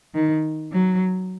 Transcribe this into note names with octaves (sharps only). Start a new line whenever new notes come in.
D#3
F#3